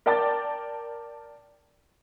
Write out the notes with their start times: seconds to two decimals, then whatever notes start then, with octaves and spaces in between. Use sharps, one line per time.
0.06 A#4 D5 G5 A5 D6 A6